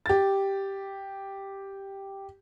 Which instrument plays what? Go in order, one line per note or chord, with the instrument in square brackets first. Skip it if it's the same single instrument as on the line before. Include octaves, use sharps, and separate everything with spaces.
[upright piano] G4 A6